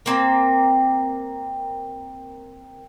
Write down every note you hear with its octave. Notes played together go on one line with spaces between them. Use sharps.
A#3 C4